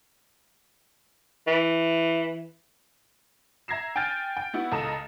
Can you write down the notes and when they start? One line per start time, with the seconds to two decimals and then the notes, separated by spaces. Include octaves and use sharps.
1.47 E3
3.68 E5 A#5 G#6 A#6 C7 E7
3.96 G5 G#5 F6 G6 A6 D7
4.37 G5
4.54 B3 E4 F#4
4.72 C#2 A4 D#5 A#5 E7